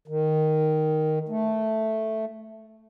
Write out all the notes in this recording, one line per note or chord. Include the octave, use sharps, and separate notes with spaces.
D#3
A3